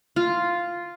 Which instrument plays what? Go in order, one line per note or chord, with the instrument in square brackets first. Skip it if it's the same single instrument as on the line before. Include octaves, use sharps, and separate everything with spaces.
[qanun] F4